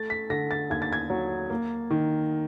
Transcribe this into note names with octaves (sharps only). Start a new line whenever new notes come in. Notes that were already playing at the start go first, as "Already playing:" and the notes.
Already playing: A3 A6
B6
D3 A#6
A6
D#2 G#6
A6
G#6
F#3
A#3
D#3